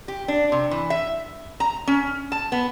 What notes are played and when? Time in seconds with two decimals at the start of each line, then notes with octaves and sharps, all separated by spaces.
0.08 G4
0.28 D4
0.52 C3
0.71 E3
0.90 E5
1.60 A#5
1.87 C#4
2.32 A5
2.52 B3